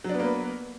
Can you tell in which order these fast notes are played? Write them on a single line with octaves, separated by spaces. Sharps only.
F#3 D4 B3 A#3 B4